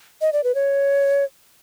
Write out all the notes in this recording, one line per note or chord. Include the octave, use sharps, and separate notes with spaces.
D#5
D5
B4
C#5